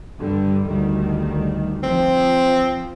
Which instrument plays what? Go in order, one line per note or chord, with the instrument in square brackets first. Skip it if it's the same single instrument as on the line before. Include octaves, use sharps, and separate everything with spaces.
[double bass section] G2 D3 G3
D2 D#3 G3
[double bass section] F3 [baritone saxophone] C4